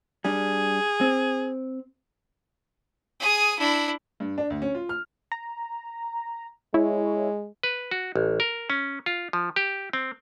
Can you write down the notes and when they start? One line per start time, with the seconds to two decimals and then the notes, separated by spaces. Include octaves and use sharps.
0.25 G3 D4 G#4
1.01 C4
3.20 G#4 D#6
3.59 D4 E4
4.20 G2
4.38 D4
4.50 D2
4.62 C#4
4.75 F4
4.89 F6
5.32 A#5
6.74 G#3 E4 C#5
7.63 B4
7.91 F#4
8.16 A1
8.40 A#4
8.70 C#4
9.06 F4
9.33 F3
9.56 G4
9.93 C4